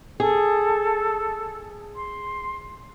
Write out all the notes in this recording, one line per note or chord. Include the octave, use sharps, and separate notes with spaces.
G#4 A4
C6